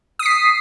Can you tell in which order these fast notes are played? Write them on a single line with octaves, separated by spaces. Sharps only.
D#6 B6 C7